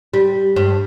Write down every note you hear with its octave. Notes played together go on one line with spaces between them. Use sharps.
G3
G2